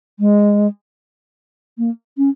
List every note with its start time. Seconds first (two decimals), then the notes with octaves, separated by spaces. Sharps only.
0.20 G#3
1.78 A#3
2.18 C#4